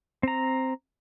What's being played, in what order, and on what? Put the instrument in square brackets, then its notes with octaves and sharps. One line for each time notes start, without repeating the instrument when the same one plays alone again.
[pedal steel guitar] C4 A#5